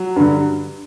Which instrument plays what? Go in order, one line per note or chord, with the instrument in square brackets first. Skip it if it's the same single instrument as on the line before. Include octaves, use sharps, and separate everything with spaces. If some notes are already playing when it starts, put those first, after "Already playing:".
Already playing: [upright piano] F#3
G2 D3